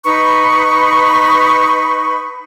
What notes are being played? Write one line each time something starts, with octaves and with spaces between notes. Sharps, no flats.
D#4 B4 B5 C#6